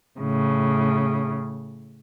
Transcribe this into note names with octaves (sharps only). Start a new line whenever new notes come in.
A2 C#3